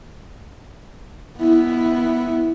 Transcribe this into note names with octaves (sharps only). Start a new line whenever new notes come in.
B3 E4